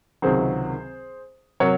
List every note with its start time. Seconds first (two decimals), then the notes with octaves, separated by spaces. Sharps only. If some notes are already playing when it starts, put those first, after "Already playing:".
0.22 C#2 C3 D#3 F#3 G#4 C5
1.60 C3 F#3 A#4 C#5